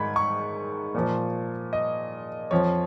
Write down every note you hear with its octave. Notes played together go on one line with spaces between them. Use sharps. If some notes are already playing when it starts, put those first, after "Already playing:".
Already playing: G#2 D#3 B5 G#6
C#6
A#2 F3
D#5
F2 F3 C#5